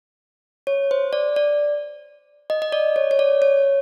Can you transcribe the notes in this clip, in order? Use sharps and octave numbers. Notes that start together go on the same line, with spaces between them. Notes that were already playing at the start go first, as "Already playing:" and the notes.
C#5
C5
D5
D5
D#5
D#5
D5
C#5
C#5
D5
C#5